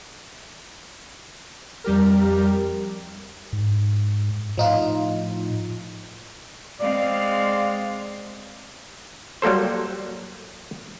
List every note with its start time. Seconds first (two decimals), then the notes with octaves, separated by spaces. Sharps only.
1.84 F2 G3 G4 A#4
3.53 G#2
4.58 A2 F3 D#4 F4
6.80 G#3 C4 D5 F5
9.42 F#3 G3 A#3 A4 C5